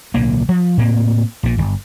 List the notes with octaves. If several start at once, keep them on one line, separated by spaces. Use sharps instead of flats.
D1 B1 D3 A#3
F3
A2 A#3 C4
A#1 A#2
G1